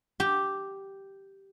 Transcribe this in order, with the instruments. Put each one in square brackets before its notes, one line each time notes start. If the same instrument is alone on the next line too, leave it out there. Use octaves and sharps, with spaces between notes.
[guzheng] G4